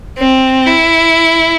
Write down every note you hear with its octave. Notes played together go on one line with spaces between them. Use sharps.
C4
E4